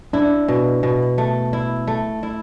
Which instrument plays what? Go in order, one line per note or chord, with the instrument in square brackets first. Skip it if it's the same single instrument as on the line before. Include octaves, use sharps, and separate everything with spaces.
[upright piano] D4 [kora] E4
[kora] B2
B2
A3
E4
A3
E4